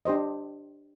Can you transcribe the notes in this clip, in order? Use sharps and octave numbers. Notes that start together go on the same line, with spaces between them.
D4 G4 C5 D#5